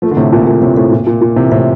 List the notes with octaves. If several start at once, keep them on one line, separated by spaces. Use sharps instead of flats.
F3 A3
D3
A2 C3
A#2
A#2
A2 C3
A2 C3
A#2
A#2
A#2
C3 E3
A2 C3